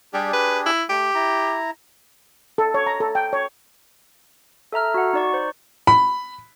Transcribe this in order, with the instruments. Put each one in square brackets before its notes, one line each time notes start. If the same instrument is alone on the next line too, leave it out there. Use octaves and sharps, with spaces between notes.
[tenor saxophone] G3 [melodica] D4 G4 G#4
[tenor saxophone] B4
E4
[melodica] A3 [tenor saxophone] G4
[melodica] E4 A#5
[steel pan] A4
C#5
A#5
A4
G5
C#5
[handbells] A4 E5 A#5 F6
F#4 F#5
D#4 D5 C#6
C5
[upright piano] B5